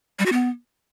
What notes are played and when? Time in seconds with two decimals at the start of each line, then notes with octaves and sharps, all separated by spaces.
0.19 G3
0.26 F#4
0.32 B3